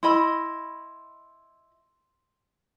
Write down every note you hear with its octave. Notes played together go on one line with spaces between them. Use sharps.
E4 D#5 B5 C6 E6